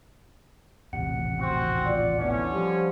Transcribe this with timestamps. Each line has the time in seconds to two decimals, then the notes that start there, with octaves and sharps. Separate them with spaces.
0.93 D#1 A1 C3 F#5
1.39 C4 F#4
1.85 F4 D5
2.19 D3 E3 B3 C#4 D4
2.51 F3 G3